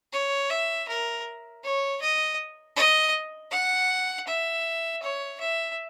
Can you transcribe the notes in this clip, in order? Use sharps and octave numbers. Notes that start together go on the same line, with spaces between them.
C#5
E5
A#4
C#5
D#5
D#5
F#5
E5
C#5
E5